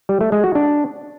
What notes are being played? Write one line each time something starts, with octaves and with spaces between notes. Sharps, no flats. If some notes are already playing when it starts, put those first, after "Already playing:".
G3
A3
G#3
F#4
D4